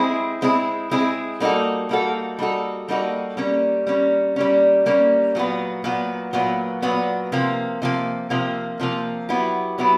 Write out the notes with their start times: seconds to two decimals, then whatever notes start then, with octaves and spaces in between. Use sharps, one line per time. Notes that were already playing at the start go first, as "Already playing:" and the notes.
Already playing: G#3 C4 E4 G#4
0.42 G#3 C4 E4 G#4
0.91 G#3 C4 E4 G#4
1.40 G3 A#3 D#4 F#4 A4
1.89 G3 A#3 D#4 F#4 A4
2.39 G3 A#3 D#4 F#4 A4
2.88 G3 A#3 D#4 F#4 A4
3.37 G3 A#3 C#4
3.87 G3 A#3 C#4
4.36 G3 A#3 C#4
4.86 G3 A#3 C#4
5.35 A#2 F#3 B3
5.84 A#2 F#3 B3
6.33 A#2 F#3 B3
6.82 A#2 F#3 B3
7.32 C3 F3 A#3
7.82 C3 F3 A#3
8.30 C3 F3 A#3
8.80 C3 F3 A#3
9.29 F#3 B3 E4 G4
9.78 F#3 B3 E4 G4